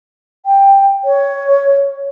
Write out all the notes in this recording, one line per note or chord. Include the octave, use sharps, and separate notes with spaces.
G5
C#5